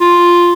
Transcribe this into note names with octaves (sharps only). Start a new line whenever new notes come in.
F4